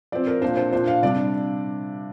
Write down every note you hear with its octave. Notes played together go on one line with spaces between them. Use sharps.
F3 C4 D5
A#4
A#2 A#3 D4 C5
C5
A#2 F3 D4 C5
F5
C3 G3 D4 D5